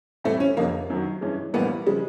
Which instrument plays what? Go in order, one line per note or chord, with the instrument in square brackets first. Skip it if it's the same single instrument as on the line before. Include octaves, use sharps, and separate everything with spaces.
[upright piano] A2 E3 G3 C4 E4 [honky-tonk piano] A3
[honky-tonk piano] C#4
[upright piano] F1 F2 D3 [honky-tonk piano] A#3
[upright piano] F#2 D#3 F#3
G2 E3 G#3 C#4
[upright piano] A#1 A2 E3 G3 A#3 [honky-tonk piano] B3
[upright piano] C#3 F3 G#3 [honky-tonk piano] G3